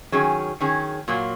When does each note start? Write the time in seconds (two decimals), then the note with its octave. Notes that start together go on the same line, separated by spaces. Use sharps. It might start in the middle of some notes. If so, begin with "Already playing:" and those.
0.12 D#3 F#3 C#4 G#4
0.60 D#3 F#3 C#4 G#4
1.08 A#2 F#3 A#3